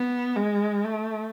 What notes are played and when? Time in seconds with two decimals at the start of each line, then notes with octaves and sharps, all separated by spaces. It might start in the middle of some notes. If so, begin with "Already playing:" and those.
Already playing: B3
0.36 G#3
0.84 A3